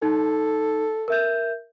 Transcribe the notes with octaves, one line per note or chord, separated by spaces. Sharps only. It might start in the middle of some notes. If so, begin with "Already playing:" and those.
D#4 A4
A#4 E5 G6